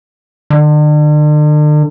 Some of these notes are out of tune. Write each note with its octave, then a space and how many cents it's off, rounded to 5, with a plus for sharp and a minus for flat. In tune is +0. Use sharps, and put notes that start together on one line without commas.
D3 +40